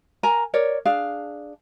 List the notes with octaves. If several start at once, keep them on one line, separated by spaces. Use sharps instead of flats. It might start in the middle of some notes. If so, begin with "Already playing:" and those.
A#4 G#5 A#5
A#4 C#5 D5
D4 G#4 F5